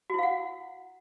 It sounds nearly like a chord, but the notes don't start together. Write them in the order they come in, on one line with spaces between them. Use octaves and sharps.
F#4 E4 F5 F#5